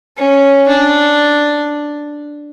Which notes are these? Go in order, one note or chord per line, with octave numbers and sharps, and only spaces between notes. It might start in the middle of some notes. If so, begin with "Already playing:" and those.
C#4
D4